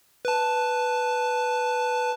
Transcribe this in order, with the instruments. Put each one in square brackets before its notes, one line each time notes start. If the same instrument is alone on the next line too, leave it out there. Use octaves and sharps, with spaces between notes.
[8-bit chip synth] B4 A5